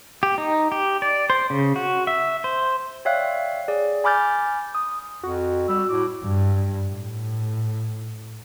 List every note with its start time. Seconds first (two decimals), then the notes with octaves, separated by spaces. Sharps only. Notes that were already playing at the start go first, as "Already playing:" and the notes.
0.23 G4
0.38 D#4
0.72 G4
1.02 D5
1.30 C5
1.50 C#3
1.76 F#4
2.07 E5
2.44 C5
3.05 C#5 D5 E5 F5 G5 F#6
3.68 G#4 D5
4.04 G#5 B5 D6 F6 G6 A6
4.75 D#6
5.23 F2 F#4
5.68 G3 E6
5.89 A2 D6
6.24 G2
6.88 A2